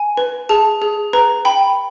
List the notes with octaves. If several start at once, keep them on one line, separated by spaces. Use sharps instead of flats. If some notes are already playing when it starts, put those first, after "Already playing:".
Already playing: G#5
B4
G#4 A5
G#4
B4 A#5
G5 B5